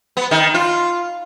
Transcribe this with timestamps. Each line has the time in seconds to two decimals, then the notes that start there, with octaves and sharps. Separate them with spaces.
0.17 B3
0.31 D#3
0.54 F4